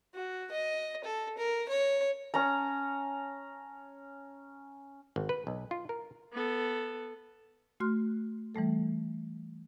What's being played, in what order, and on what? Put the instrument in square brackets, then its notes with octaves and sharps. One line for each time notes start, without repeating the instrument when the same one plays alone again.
[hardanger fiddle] F#4
D#5
A4
A#4
C#5
[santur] C#4 A5 A#5
[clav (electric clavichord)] G#1
B4
B1
F4
A#4
[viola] B3 A4
[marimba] A3 F#4 C6 F6
E3 G3 A3 A4